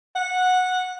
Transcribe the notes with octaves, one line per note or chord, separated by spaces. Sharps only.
F#5